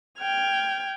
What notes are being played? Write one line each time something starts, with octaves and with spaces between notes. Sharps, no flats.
G5 F6 G#6